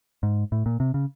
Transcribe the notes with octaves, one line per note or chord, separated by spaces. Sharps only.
G#2
A2
A#2
C3
C#3